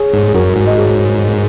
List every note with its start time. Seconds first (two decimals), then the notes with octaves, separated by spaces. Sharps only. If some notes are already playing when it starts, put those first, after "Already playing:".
Already playing: G#4 C#5
0.13 G#2
0.29 G#4
0.34 F#2 F#4 A#4
0.56 G#2
0.67 D#5
0.78 G#4 C#5